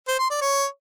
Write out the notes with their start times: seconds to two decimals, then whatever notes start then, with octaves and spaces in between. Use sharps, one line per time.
0.08 C5
0.19 C6
0.30 D5
0.41 C#5